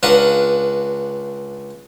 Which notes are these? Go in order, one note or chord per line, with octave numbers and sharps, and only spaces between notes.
C#2 D4 B4 F5 F#5 A#5